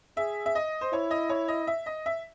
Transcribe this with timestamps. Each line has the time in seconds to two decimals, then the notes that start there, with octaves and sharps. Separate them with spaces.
0.17 G#4 E5
0.46 E5
0.55 D#5
0.81 C5
0.92 E4 C#5
1.11 D#5
1.29 C#5
1.48 D#5
1.67 E5
1.86 D#5
2.06 E5